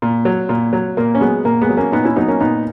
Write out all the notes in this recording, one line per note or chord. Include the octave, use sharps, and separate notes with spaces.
A#2
F#3
A#2
F#3
A#2 A#3
C#4
F#3 G#3 B3
A#2 A#3
G#3 B3
F#3
A#3 C#4
A#2 B3 D#4
C#4 E4
F#3 B3 D#4
A#3 C#4
A#2 B3 D#4